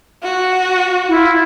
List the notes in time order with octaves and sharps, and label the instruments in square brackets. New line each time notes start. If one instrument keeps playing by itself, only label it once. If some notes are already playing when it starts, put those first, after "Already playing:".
[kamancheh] F#4
[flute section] E4 F4